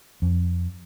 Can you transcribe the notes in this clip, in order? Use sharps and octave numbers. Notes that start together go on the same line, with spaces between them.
F2